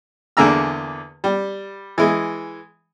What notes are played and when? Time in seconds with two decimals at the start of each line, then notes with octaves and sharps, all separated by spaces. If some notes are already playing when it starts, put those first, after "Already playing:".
0.37 E2 D3 A#3 G#4 A#5 E6
1.24 G3
1.98 E3 G#3